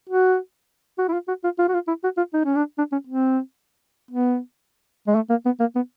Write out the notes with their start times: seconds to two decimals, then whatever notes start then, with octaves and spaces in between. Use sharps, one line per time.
0.09 F#4
0.98 F#4
1.08 E4
1.13 F4
1.28 F#4
1.44 F4
1.59 F4
1.68 F#4
1.74 F4
1.88 E4
2.04 F#4
2.17 F4
2.33 D#4
2.45 C#4
2.56 D4
2.78 D4
2.92 C#4
3.07 C4
4.11 B3
5.07 G#3
5.15 A3
5.30 A#3
5.45 B3
5.60 A#3
5.76 B3